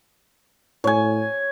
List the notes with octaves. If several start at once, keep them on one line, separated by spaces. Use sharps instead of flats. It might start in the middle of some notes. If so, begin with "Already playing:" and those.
A2 C#5 G#5